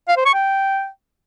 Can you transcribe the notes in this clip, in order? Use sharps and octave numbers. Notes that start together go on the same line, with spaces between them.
F5
C5
C#6
G5